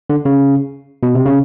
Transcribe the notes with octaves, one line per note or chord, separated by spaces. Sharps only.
D3
C#3
B2
C3
C#3